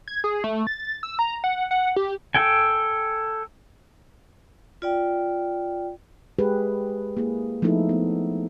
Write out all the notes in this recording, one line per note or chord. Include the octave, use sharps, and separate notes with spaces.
G#6
G#4
A3
A6
E6
A#5
F#5
F#5
G4
A4 G5 G#5
F4 D5 G5
G#3 G4 G#4 B4
A#3 E4 G#4
F3 A3 B3 D#4 E4 A4
B3